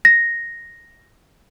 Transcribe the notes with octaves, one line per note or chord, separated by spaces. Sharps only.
A#6